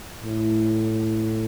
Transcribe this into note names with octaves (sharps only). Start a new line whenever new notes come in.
A2